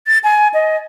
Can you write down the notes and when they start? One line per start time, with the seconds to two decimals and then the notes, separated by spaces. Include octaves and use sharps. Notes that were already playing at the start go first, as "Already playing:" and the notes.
0.07 A6
0.24 G#5
0.54 D#5